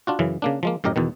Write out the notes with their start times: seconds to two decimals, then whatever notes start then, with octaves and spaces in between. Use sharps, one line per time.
0.07 D4 F4 F#4
0.19 F#2 C#3 E3
0.42 C#3 A#3 D4
0.63 F3 G#3 A#3
0.84 F#2 A2 G4 A#4 D#5
0.96 E2 B2 D#3